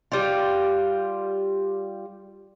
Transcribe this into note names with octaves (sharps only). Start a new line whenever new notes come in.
G3 F4